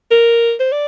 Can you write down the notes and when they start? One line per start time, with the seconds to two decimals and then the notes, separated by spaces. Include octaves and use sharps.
0.11 A#4
0.60 C5
0.72 D5